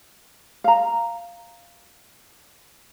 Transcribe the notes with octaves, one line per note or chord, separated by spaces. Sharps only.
F5 A#5